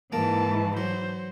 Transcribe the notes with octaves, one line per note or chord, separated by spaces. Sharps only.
G#2 E3 A#3 A5
F#3 C5